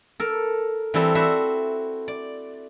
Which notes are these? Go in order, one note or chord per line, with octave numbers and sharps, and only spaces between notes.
A4 A#4
E3 G3 C4 A4
C4 E4 F#4 C5 E5
D5